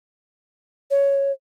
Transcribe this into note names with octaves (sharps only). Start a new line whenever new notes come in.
C#5